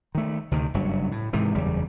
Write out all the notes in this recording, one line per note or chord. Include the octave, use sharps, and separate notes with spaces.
D#3 A3
D2 C3 D#3
F#1 G2 F#3
A2
G#2 C3 D#3 E3
F#1 E2 C#3 G3